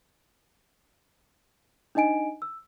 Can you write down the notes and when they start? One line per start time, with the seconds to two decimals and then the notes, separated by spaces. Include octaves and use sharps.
1.95 D4 D#4 D#5 G#5 D7
2.42 E6